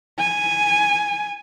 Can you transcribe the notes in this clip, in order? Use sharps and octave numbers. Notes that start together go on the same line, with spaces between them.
G#5